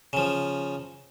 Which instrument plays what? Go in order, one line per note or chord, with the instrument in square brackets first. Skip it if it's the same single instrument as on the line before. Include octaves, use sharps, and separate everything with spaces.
[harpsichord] C#3 F3